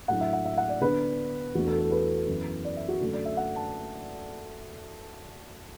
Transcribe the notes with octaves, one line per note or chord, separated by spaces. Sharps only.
A2 F#3 D4 F#5
E5
F#5
E5
F#5
D5
D3 B3 D4 B4
E2 E3 A3 D4 F#4
A4
A4
B4
F#2 E3 B3
D5
E5
F#4
F#2 D3 F#3 A3 A4
D5
E5
F#5
A5